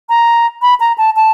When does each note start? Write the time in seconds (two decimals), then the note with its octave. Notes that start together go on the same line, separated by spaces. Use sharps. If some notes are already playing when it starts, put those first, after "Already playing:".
0.09 A#5
0.62 B5
0.80 A#5
0.98 A5
1.16 A5